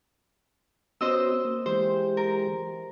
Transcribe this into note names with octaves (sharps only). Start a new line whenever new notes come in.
B3 C#4 F#4 C5 D#5 E6
A#3
E3 G#3 G4 C5
A#4